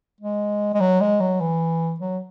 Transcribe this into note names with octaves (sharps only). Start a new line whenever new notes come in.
G#3
G#3
F#3
G#3
F#3
E3
F#3